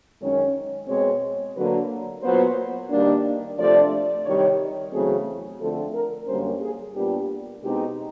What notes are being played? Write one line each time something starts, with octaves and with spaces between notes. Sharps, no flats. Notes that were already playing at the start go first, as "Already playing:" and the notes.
F#2 D#3 G#3 C#4
B2 G#3 C4 C#5
D3 F#3 A#3 B4
A#2 F#3 B3 C5
G2 D#3 G3 A#3 D4
C3 F3 A3 D4 D5
C3 D#3 G3 C#5
E2 C#3 F#3 A3 C4 G#4
D3 F3 A3 C4 A4
A#4
F#2 D3 G3 A#3 C#4 C5
G#4
A#2 G3 B3 D4 G4
B2 G#3 C4 D#4 G4